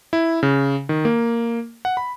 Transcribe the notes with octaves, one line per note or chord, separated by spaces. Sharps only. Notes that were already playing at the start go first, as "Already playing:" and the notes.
E4
C#3
D#3
A#3
F#5
B5